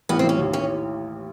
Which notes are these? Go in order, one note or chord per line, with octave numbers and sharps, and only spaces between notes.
A1 B3
C4
A1 C#4
D#2
C#4